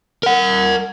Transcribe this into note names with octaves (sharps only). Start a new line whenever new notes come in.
A#4 F#5